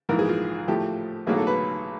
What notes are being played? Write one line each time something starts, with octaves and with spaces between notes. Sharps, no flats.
A#1 G#2 E3 A#4
G#4
F4
A2 F3 A3 G4
B1 A2 F#3 A#3 G#4
A4
B4